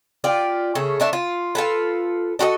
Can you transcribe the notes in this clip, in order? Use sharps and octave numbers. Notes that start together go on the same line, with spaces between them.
F4 G4 D5
C#3 A3
A3 D4 E5
F4
F4 A4 B4
D4 F#4 A4 D#5